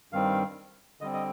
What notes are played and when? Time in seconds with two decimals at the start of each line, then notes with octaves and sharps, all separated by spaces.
0.12 G2 D#3 G3 C4 F5
1.01 D3 G3 C4 D#5
1.13 D#5